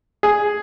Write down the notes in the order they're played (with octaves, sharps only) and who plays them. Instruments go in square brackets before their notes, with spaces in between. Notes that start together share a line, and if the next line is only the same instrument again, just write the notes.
[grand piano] G#4